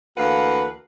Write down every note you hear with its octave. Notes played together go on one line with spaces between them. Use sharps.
D2 E3 A#3 B4 F5 F#5